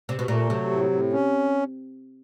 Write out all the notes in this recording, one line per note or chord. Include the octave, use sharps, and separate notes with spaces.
C3
B2
A#2 A3
C3 F#3
A2
A2
C#4